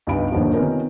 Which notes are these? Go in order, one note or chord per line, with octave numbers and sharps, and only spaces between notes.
C#2 G2 B3 D#4 B5 D7
G1 D#2 A#2 D3 D#3 F3
C3 D#3 B3 C#4 F4 A#4